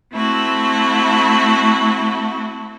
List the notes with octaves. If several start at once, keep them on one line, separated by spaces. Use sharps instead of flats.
A3 C4 E4 F#4 A4